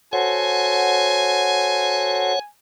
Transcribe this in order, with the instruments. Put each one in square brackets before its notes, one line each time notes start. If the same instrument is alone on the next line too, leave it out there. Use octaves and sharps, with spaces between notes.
[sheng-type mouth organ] F#4 A4 C5 [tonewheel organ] C#5 F#5 [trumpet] G#5